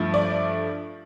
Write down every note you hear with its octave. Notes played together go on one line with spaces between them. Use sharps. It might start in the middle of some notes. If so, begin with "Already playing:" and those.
Already playing: G2 F3 A3
D5